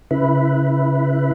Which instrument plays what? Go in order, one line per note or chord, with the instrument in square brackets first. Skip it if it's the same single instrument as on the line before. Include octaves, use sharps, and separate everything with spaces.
[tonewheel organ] C#3 E4 B4